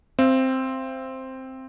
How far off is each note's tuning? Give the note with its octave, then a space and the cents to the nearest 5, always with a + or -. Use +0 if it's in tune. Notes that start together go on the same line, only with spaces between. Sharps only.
C4 +0 F5 -40